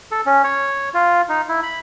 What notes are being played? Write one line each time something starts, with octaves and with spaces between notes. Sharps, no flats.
A4
C#4
C#5
F4
D#4
E4
B5